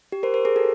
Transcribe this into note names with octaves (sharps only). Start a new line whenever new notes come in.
G4
A#4 C5
A#4 C5
G#4 A#4
G4 A4